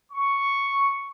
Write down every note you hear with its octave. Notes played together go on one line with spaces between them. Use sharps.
C#6